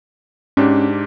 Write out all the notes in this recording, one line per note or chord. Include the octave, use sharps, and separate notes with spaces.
G#2 C#4 D4 G4